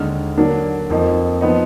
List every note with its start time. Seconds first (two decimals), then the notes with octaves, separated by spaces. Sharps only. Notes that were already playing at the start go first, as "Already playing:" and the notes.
Already playing: D#2 D3 G#3 D#4 F6
0.37 D3 F#3 A#3 D4
0.90 F2 F3 A#3 D#4
1.41 F3 B3 D#4